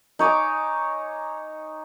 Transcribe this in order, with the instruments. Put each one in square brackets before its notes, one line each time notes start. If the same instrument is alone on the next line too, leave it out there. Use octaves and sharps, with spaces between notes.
[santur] D#4 C#5 G#5 D6